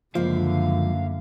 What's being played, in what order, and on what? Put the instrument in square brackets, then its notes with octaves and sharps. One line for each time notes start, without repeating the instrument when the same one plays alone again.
[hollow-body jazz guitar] C#2 F3 [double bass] F#2 D3 [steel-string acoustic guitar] A#3 E4 [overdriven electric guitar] F5